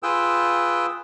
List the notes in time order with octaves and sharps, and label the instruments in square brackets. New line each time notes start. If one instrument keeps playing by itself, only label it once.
[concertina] F4 G#4 B4 G5 E6